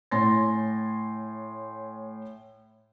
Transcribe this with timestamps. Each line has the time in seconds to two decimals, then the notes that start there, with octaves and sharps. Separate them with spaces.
0.11 A2 C#5 G#5 C6 A6 A#6